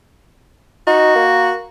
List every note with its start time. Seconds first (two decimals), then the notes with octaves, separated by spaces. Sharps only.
0.87 D#4 F#4
1.15 A#3